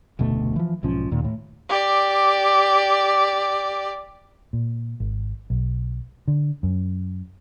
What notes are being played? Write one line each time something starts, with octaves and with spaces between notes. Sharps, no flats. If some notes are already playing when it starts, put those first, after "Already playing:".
F1 D2 B2 A3
E3 F3
B1 G#2 F3 C#4
D#2 A#2 D#3
A2
G4 D5
A#2
G#1
B1
D3
F#2